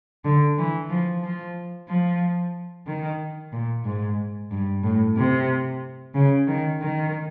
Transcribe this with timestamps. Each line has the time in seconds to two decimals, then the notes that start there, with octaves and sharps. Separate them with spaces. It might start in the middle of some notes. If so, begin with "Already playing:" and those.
0.25 D3
0.58 E3
0.90 F3
1.23 F3
1.88 F3
2.86 D#3
3.53 A#2
3.85 G#2
4.51 G2
4.83 A2
5.17 C3
6.14 C#3
6.47 D#3
6.81 D#3